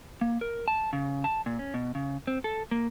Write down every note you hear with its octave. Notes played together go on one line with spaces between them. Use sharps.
A#3
A#4
A5
C#3
A5
A#2
C#4
B2
C#3
C4
A4
A#3